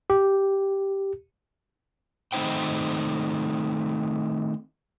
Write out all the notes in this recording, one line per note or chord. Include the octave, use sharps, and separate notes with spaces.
G4
D#3 A3 C4 D#4 C5 G5